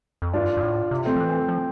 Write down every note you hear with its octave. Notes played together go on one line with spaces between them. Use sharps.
F2
G2 D4 F4
G2
A2
C3
A3 C4
F3
E3
F3